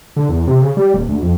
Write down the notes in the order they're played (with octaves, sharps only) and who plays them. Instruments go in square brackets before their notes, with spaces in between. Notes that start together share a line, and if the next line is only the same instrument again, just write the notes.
[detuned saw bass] D3
E2
C3
C#3
G3
D#1
D2
F2